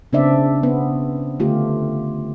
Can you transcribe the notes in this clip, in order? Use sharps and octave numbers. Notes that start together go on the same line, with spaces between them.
C#3 B3 C4 D4 D5 E5
B3
D3 A3 F4 G4